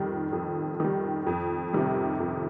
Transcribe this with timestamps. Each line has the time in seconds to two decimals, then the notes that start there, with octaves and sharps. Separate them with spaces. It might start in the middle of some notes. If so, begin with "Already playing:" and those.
Already playing: F2 D#3 G3
0.33 F2
0.80 D#3 G3
1.27 F2
1.73 C3 D#3 G3
2.20 F2